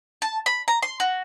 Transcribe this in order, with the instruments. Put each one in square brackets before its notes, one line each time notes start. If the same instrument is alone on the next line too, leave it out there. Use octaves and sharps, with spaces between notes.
[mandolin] A5
B5
A#5
C6
F#4